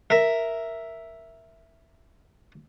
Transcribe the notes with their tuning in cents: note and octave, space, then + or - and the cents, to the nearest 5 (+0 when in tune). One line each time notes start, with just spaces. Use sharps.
A#4 +0 E5 +0